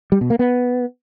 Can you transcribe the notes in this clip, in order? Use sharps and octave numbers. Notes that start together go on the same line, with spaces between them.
G3
B2
A#3
B3